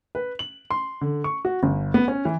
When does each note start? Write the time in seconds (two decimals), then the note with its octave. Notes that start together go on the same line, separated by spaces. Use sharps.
0.15 B4
0.39 F#7
0.71 C6
1.01 D3
1.24 C#6
1.45 F#4
1.63 G1
1.94 B3
2.08 C#4
2.25 E3